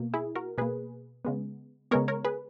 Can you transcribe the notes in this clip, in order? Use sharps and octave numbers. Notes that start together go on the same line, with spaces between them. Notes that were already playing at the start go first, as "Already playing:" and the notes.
Already playing: B2 A#3
E4 G#4
F#4 A#4
B2 A#3 G#4 B4
C#3 G#3 B3
C#3 G#3 B3 A#4 C#5
A#4 C#5
G#4 B4